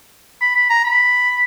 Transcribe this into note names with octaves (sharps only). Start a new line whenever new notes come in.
B5
B5
A#5
B5